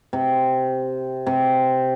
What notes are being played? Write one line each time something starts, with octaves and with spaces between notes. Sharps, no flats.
C3
C3